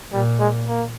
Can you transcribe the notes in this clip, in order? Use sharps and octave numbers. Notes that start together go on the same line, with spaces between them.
A#2 G3
G#3
A#3